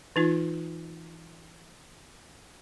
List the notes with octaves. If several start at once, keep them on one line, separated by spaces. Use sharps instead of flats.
E3 D#4 F4